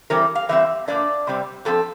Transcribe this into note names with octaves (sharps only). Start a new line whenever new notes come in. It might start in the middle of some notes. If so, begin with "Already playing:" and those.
E3 G3 C4 A#4
F5
E3 G3 C4 E5
A#2 G3 A#3 D4 D5
C3 G3 C4
A2 F3 C4 A4